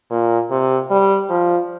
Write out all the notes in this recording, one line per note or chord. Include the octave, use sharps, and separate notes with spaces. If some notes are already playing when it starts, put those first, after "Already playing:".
A#2
C3
G3
F3